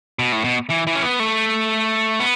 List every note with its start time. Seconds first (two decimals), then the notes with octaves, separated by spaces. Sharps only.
0.19 B2
0.32 A2
0.44 B2
0.70 E3
0.87 E3
0.95 C#4
1.03 B3
1.20 A3
2.20 B3